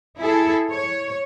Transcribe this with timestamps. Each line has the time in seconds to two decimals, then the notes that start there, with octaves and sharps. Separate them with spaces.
0.18 E4 G#4 A4
0.70 C#5